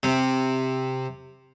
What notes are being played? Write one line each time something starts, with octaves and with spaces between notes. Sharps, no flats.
C3